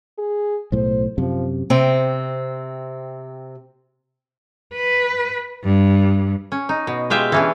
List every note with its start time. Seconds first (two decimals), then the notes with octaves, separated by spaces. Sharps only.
0.18 G#4
0.72 B1 A2 C5
1.18 F#2 C3 F3
1.70 C3 C4
4.74 B4
5.64 G2
6.52 C#4
6.69 D#4
6.87 B2
7.10 G#3 F4 G4 E5
7.32 E3 C#4 D4